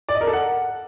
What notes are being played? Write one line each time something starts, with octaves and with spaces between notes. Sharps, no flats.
D5
D#5
A#4
A4
F#5